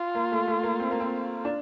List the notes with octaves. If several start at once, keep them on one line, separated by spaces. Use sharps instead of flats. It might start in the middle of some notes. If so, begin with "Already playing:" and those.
Already playing: F4
A#3
A3
A3
A#3
C4
A#3
C4
D4